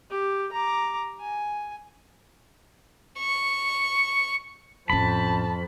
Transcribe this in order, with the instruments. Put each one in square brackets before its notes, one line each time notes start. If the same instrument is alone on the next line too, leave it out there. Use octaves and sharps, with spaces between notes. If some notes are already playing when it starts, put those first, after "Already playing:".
[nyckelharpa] G4
A#5 D6
G#5
[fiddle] C#6
[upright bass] A1 C#4 [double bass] F2 [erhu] A5 [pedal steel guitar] B5